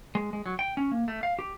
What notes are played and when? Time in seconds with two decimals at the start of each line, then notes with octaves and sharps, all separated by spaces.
0.15 G#3
0.33 G#3
0.46 F#3
0.59 G5
0.77 C#4
0.92 A#3
1.08 A3
1.23 F5
1.39 G4